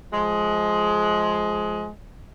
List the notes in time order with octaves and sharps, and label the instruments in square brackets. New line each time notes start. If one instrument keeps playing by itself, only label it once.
[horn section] F3 G#3